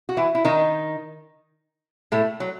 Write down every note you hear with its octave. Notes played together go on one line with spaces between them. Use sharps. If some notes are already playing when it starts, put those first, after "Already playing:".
F#4
E3 E4
E4
D#3 D#4
A2 A3
F#3